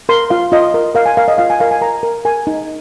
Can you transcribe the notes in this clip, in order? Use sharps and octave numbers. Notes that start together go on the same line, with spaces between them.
A#4 C6
F4 F5
F4 D#5
A#4
A#4 F5
G#5
A#4 F5
D#5
F4 F5
G#5
A#4 F5
G#5
A#4 A#5
A#4
A#4 G#5
D#4